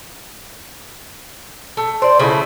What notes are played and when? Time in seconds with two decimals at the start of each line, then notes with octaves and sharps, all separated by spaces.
1.77 A3
2.02 C5 D5
2.19 C#3 F3 A3 E4